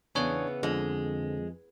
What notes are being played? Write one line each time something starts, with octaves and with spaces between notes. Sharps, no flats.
E2 C#3 E3 B3 D4 G#4 C#5
F2 D3 F3 G#3